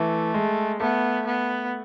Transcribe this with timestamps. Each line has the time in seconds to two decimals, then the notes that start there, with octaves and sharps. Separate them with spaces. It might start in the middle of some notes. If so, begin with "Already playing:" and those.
Already playing: E3 A3
0.34 G#3
0.80 A3 B3
1.26 B3